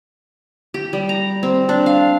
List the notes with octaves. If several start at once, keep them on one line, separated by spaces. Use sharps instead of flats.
G4
G3
A#5
C4
D4
F5